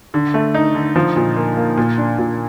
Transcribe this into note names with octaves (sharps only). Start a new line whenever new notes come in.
D3
A3
D#4
D3
F3
A#2
A#3
A#3
A#2
D4
A#2